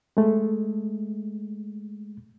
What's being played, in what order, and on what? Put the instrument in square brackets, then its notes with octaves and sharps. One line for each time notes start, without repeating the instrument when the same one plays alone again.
[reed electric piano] G#3 A3